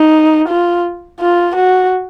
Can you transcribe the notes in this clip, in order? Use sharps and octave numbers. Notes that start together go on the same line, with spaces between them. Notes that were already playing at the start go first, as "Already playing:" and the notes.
Already playing: D#4
F4
F4
F#4